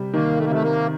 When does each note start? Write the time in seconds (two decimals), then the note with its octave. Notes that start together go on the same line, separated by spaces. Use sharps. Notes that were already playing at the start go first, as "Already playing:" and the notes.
Already playing: C3 G3
0.14 D#3 A#3
0.38 A3
0.45 A#3
0.50 C3 A3
0.62 A#3